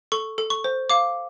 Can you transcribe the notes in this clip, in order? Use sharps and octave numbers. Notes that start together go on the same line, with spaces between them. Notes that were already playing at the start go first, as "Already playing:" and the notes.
A4 C#6
A4
C#6
C5
F5 D6